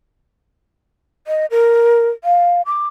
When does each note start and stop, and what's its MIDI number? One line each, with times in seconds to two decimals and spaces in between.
1.27 1.46 75
1.51 2.10 70
2.24 2.62 77
2.66 2.88 86